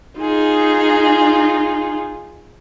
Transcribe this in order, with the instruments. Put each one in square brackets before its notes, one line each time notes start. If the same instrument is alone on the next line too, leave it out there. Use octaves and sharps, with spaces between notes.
[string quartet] D#4 F4 G#4